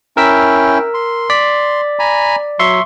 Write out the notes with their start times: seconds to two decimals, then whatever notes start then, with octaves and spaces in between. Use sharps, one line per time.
0.17 C#4 E4 A#4 G5 E6 B6
0.94 C6
1.30 D5 B6
1.99 G#5 A#5 B5
2.59 F#3 E5 C6 C#6